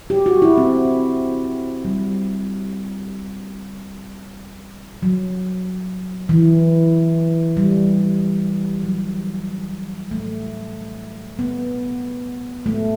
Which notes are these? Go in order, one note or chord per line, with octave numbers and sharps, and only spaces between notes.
G4
F#4
E4
C4
G3
F#3
E3
G3
F#3
A3
B3
A3